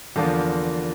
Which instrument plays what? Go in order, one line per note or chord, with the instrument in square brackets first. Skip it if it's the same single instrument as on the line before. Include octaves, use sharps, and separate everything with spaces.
[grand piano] E2 D3 F3 A#3 F4